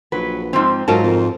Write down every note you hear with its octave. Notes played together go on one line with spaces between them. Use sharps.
A#1 F#3 B4
G#2 F3 C4
G#2 F#3 D#4 F4 A#4 A5
F2